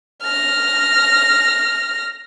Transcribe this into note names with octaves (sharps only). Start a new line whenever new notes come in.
F6 A#6